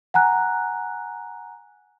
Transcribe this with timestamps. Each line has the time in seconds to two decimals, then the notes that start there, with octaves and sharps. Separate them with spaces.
0.14 F#5 G#5 A#5 F#6